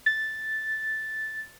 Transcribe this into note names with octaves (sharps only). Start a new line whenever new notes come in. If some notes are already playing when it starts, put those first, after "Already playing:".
A6